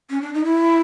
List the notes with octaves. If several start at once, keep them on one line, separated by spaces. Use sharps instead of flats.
C#4
D4
D#4
E4